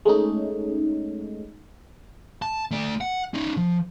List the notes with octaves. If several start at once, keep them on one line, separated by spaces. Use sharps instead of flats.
G#3 A3 C#4 D#4
A5
A3 D5
F#5
C#4 D#4
F3